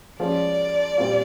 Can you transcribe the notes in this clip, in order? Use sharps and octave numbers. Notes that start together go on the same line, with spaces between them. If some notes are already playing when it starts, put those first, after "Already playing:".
F3 G#3 C#4 F4 D5
A#2 G3 C4 F4